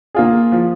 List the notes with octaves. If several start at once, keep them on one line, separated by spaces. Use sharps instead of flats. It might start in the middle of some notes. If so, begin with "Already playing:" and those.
A#3 F4 G#4
F3